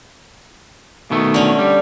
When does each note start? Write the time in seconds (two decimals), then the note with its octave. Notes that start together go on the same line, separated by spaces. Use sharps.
1.11 B2 D#3 A3
1.34 D3 C#4
1.59 G3